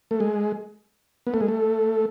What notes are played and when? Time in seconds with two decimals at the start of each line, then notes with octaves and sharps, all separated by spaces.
0.11 A3
0.20 G#3
1.27 B3
1.34 A3
1.41 G#3
1.48 A3